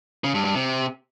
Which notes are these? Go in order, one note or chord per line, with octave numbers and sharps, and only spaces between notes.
C#3
G2
G2
C3